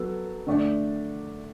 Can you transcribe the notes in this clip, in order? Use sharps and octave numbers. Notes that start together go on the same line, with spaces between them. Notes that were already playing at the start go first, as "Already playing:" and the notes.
Already playing: F#3 B3 A4
D3 A3 D4